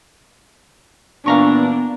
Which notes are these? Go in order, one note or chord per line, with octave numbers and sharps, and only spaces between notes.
A#2 E3 B3 D4 F5 A#5 C#6